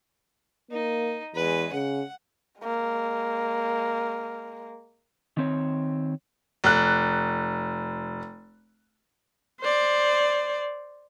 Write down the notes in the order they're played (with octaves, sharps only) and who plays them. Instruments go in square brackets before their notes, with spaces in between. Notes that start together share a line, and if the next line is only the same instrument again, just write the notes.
[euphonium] A#3 [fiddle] D#4
[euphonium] E2 [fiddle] G#3 B4
[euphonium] C#3 [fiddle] F#5
[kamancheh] G#3 A#3
[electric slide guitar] D#3 C4 C#5
[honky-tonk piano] F1 F#6
[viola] C5 D5